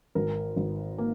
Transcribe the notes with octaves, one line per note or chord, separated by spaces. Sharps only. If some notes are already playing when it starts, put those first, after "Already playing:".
G#1 A#4
G#1
A#3